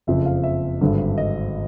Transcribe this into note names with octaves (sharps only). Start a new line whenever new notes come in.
F#1 F2 C#3 F3 E5
F5
E5
G#1 G2 D3
D#5